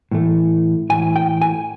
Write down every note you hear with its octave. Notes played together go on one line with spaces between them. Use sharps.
A2 E3 A3
A2 E3 A3 G#5
G5
G#5